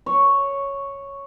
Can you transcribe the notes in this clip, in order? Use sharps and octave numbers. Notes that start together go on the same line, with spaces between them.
C#5